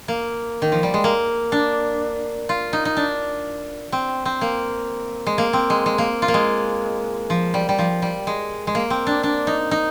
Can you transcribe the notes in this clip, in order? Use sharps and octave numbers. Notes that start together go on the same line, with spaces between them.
A#3
D#3
F3
G3
G#3
A#3
D4
F4
D#4
D#4
D4
C4
C4
A#3
G#3
A#3
C4
G#3
G#3
A#3
F4
A#3
G#3
F3
G3
G3
F3
G3
G#3
G#3
A#3
C4
D4
D4
D#4
D#4